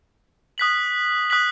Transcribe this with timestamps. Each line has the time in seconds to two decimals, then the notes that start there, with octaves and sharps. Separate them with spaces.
0.58 D#6 F#6 B6 F#7
1.30 D#6 F#6 B6 F#7